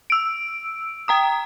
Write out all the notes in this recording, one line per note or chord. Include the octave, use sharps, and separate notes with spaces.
E6 D7
G5 A#5 D#6